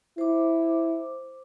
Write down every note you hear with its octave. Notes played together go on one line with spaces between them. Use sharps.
E4 C5 D6